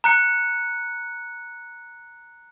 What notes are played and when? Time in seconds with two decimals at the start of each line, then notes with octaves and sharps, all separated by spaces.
0.04 A#5 F#6 C#7